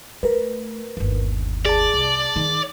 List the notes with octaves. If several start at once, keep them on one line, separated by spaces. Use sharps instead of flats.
A3 A#4 B4
G1 D#2
G#4 D5 A5
C2
D#3 D#4